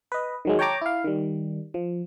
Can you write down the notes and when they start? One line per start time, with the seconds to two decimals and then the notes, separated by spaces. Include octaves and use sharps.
0.12 B4 D#5
0.45 D#3 F#3 G#3
0.59 C#5 G5 A5 A#5 D6
0.82 E4 F5
1.04 D#3 G3
1.74 F3